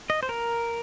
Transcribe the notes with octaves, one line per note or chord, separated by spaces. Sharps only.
D#5
C5
A#4